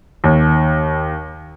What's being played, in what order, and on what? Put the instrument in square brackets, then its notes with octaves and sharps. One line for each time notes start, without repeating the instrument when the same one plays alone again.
[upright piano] D#2